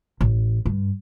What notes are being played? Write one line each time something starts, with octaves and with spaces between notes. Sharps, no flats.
A1
G2